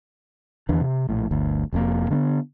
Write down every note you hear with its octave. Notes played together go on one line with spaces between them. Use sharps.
E2 D#3 E3 D4
C3
A#1 A2
G1 D2
F1 F2 A#2 A#3
D3 A#3 B3